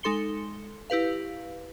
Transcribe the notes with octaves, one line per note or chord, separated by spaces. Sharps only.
G#3 D#4 A4 C6 C#7 G7
E4 G4 B4 F5